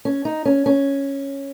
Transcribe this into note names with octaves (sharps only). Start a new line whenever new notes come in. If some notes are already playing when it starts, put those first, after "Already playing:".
C#4
D#4
C#4
C#4